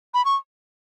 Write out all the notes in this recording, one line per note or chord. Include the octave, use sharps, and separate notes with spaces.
B5
C#6